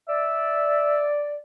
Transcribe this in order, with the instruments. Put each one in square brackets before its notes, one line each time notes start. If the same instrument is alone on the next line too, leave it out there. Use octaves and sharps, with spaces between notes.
[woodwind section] D5 [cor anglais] E5